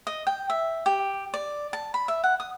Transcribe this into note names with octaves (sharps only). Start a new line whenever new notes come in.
D#5
G5
E5
G4
D5
A5
B5
E5
F#5
D#6